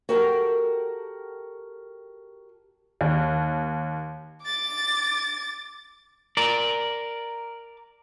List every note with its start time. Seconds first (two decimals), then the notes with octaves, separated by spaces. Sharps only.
0.09 F#4 G4 A4 A#4 G5
3.01 D#2
4.43 D6 A6
6.37 A#4 D5